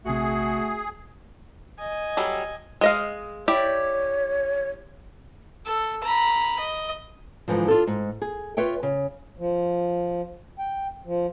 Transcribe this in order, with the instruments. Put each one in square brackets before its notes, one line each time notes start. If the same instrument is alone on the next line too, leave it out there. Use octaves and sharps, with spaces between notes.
[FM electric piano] A#1 C3 [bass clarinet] A3 [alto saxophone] F#4 [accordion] G#4
[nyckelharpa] D#5 G#5
[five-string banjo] F#3 G3 A4
G#3 D#5 F5
[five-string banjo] E4 G4 D5 [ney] C#5
[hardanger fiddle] A4
A#5 B5
D#5
[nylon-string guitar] G#2 D3 E3 F3
D4 F4 G#4 A4
G#2
G#4
F4 B4 C#5 E5 G5
C#3
[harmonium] F3
G5
F3